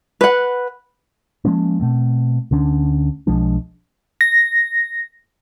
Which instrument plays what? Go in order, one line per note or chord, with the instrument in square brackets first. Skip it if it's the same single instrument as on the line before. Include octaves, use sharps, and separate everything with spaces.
[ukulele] B4 F#5
[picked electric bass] F3 G#3 A#3 C#4
B2 A3 C4
D2 D3 C#4 D4
B1 F3 G#3 D4
[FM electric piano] A#6